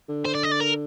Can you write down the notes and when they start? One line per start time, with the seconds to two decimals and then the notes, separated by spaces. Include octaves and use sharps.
0.08 D3
0.25 C5
0.35 D5
0.43 D#5
0.51 D5
0.60 A#4